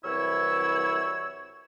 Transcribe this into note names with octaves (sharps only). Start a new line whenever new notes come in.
C2 E3 F#3 E4 C#5 E6